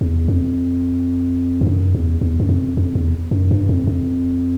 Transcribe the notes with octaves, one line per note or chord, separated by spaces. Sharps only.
E2
F2
G2
F#2
E2
E2
F#2
F2
F2
E2
F#2
G2
F2
F2